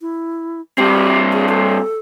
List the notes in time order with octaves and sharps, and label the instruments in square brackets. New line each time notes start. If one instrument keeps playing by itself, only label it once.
[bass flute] E4
[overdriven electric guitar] G2 C4 [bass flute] G4
[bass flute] G#4
A4